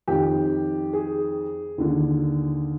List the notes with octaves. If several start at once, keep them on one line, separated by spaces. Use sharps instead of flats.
F2 D#3 G4
G#4
D#2 D3